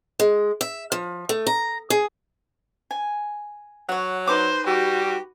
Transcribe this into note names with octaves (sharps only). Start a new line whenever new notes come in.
G#3
E5
F3
A3
A#5
G#4
G#5
F#3 C#5 F#5
D#4 B4 C5 D6
G3 F#4 G4